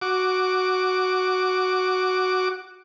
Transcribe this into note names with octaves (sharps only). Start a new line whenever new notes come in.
F#4 D6